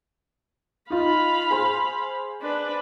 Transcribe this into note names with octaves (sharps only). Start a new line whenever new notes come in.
D#4 F4 F5 B5
G#4 C5 C6
D4 B4